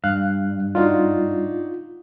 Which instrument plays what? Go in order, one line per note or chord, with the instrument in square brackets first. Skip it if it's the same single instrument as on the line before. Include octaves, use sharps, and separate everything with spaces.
[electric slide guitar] G2 [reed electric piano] F5 F#6
[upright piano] D4 D#4 F#4 [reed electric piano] F4